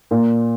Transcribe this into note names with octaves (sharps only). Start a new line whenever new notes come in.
A#2